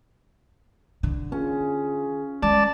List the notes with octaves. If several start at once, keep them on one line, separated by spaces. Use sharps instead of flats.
D3
C#4 F4 G#4
G#3 D5 A5